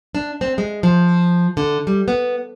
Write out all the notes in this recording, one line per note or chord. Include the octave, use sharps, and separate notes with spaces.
D4
C4
G#3
F3
D3
G3
B3